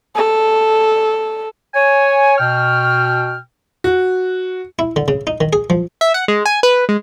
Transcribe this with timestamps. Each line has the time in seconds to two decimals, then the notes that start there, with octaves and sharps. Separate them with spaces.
0.15 A4
1.75 C#5 G#5
2.38 B2 G5 F6
3.84 F#4
4.79 E4
4.96 D3
5.08 C#3
5.27 D#4
5.41 D#3
5.53 G#4
5.70 F3
6.01 E5
6.14 F#5
6.28 G#3
6.46 G#5
6.63 B4
6.89 G#3